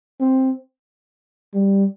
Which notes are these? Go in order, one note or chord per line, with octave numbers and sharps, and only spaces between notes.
C4
G3